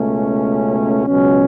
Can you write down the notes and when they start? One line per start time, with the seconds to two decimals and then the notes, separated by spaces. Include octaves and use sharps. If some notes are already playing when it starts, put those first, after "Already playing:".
Already playing: C#2 B2 A3 C#4
1.06 C#2 B2 F#3 C#4